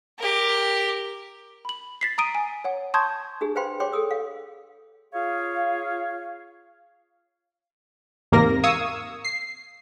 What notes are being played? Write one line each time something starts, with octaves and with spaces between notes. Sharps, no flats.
G4 A#4
B5 F#7
A6 B6 C7
A#5 D#6 D7 D#7
G#5
C#5 F#5
A5 C6 C#6 D#6 G6 G#6
D4 G4 G#4
B4 C5 F5 G5 B5 C6
G4 C#5 G5 C6 D6
G#4 A4 D#6 E6
F5
F4 G#4 C#5 F5
E2 G#2 C3 A#3 A#4 A#6
F5 C#6 D#6 E6 G#6
C7